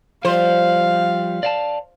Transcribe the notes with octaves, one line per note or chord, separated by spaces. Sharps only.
F3 G3 C5 F5
D5 F5 A5